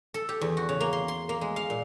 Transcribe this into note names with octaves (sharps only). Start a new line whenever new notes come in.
A4
G4
E2
F#4
C#3
A#3
C6
C6
A#3
G#3
F5
A#2